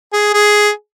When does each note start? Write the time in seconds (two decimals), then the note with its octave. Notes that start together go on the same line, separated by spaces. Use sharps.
0.13 G#4
0.33 G#4